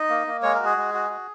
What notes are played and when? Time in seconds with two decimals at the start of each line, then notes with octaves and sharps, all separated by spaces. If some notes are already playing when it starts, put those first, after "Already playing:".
Already playing: D#4 D#5
0.09 A#3
0.27 A#3
0.43 G#3 C#5
0.55 F#4 A#4
0.65 G#4
0.77 G#3
0.94 F#4
1.10 F#4